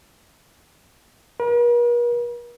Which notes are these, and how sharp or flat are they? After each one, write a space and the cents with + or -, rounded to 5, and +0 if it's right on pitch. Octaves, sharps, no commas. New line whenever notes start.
A#4 +45